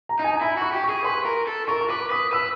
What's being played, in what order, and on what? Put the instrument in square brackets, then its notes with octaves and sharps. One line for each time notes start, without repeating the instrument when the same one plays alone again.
[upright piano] A#5
[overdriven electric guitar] D#4
[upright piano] G#5
A#5
[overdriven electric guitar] E4 [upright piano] B5
[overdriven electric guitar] F#4 [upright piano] C#6
[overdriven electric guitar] G4
[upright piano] C#6
[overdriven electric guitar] G#4
[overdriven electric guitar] B4 [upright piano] C6
[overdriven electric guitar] A#4
A4
[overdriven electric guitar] A#4 [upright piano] C#6
[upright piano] C#6
[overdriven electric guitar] B4 [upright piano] D6
[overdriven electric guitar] B4 [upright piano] D#6
[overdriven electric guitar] B4 [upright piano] E6